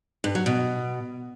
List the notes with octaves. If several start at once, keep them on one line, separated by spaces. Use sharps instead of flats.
G2
F#3
B2